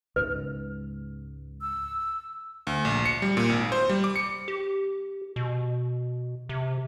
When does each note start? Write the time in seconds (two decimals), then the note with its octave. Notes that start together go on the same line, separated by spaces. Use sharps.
0.16 C#2 G#2 C#3 B4
1.61 E6
2.67 D2
2.85 A#1
3.05 C#7
3.22 G3
3.37 A#2
3.49 G#1
3.72 C5
3.89 G3
4.04 D6
4.16 C#7
4.48 G4
5.36 B2
6.49 C3